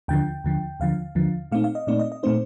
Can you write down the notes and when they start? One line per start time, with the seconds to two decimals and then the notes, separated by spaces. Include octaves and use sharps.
0.08 D#2 D3 F3 G5
0.44 D#2 D3 F3
0.80 D#2 D3 F3 F5
1.15 D#2 D3 F3
1.52 A#2 A3 C4 D#4 F5
1.64 F5
1.75 D#5
1.87 A#2 A3 C4 D#4 D5
1.99 D#5
2.12 D#5
2.23 A#2 A3 C4 D#4 C5